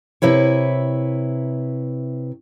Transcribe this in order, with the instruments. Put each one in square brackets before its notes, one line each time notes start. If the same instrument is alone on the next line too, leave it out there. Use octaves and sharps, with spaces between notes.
[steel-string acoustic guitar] C3 E4 B4 C#5